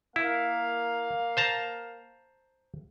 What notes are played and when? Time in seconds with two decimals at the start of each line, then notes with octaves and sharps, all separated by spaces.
0.16 A#3 E4 F5
1.37 C5 A5 A#5